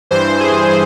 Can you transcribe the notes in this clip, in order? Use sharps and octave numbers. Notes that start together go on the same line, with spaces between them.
G2 E3 C5
G#4